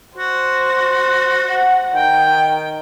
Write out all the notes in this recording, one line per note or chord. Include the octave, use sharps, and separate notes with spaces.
F#4 C5
F#5
D#3 G5